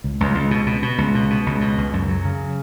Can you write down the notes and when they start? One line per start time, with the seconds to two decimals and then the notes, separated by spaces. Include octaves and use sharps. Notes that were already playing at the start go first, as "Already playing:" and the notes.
0.04 C#2
0.20 C#2
0.35 C#2
0.51 B2
0.66 B2
0.82 B2
0.98 C#2
1.15 B2
1.30 B2
1.46 C#2
1.61 B2
1.78 C#2
1.93 F#2
2.09 F#3
2.25 C#3